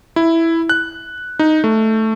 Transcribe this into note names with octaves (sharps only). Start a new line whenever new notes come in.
E4
F#6
D#4
A3